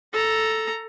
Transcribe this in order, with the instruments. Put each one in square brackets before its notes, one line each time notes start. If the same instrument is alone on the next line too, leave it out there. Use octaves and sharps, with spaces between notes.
[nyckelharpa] A4 A#5